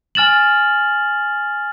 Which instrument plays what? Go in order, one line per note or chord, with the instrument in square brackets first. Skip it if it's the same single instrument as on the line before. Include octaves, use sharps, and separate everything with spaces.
[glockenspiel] G#5 F6 A6 E7 F#7